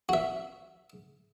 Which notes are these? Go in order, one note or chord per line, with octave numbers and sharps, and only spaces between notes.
F#4 E5